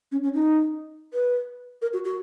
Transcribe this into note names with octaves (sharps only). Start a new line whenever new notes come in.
C#4
C#4
D#4
B4
A#4
F#4
F#4